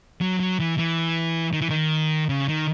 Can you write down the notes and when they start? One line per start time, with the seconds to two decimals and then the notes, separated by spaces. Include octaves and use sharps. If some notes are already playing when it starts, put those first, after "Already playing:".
0.21 F#3
0.40 F#3
0.60 E3
0.78 E3
1.53 D#3
1.61 E3
1.70 D#3
2.29 C#3
2.48 D#3